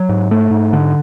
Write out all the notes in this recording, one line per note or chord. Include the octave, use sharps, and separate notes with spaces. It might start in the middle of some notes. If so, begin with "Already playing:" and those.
Already playing: F#3
G#2
A3
G#2
D3